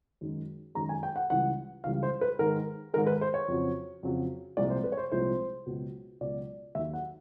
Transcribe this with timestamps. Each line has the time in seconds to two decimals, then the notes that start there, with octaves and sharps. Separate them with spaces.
0.21 F#2 D#3 G#3
0.75 F#2 D#3 G#3 A#5
0.89 G#5
1.03 G5
1.16 F#5
1.30 C#2 C#3 E3 G3 F#5
1.84 C#2 C#3 E3 G3 F5
2.03 C5
2.21 B4
2.39 G#2 D#3 G#3 A#4
2.93 G#2 D#3 G#3 A#4
3.07 B4
3.21 C5
3.34 C#5
3.48 F2 C#3 F#3
4.03 F2 C#3 F#3
4.57 C2 A#2 F3 G#3 D5
4.70 C5
4.84 B4
4.92 C#5
4.97 C5
5.12 C2 A#2 F3 G#3 C5
5.66 C#2 B2 F#3
6.21 C#2 B2 F#3 D5
6.75 D#2 D#3 F#3 E5
6.93 F#5